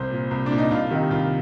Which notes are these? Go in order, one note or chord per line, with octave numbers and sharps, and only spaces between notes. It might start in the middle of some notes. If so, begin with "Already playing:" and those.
Already playing: C2 C5
A#2
C2
A#2 D4
D#4
C2 F4
C3 D#3
C2 F4